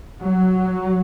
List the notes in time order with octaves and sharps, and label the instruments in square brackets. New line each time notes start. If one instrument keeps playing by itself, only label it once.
[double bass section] F#3